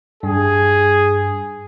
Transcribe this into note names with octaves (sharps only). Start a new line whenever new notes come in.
G2 G#4